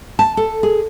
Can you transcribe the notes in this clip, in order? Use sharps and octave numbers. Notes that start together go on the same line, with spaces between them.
A5
A4
G#4